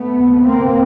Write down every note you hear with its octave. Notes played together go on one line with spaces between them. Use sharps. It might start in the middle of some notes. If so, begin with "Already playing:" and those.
Already playing: A3 B3
D2 C3
A#3 C4